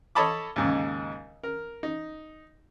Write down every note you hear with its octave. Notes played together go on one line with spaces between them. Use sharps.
A4 C#5 D#5 A5 B5 D6
D#2 G#2 C#3
A#4
D#4